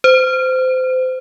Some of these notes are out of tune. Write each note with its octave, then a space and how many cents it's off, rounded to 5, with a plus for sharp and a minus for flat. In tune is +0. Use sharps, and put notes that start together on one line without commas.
C5 -30